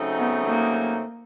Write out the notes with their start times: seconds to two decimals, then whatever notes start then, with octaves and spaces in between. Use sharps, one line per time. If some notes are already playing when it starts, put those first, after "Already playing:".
Already playing: C#3 F#3 A3 C4 D#4
0.18 B3
0.46 A#3